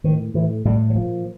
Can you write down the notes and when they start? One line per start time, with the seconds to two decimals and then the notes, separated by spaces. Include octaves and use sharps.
0.04 A2 D#3
0.34 A2 E3
0.65 A2 G3
0.90 F#3
0.95 A#2 F3